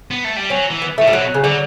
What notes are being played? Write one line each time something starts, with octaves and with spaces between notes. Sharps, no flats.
B3
A3
G3
F#3 C#4
E3
B3
A2 A3
G3
B2 F#3
C#3
D3 F#3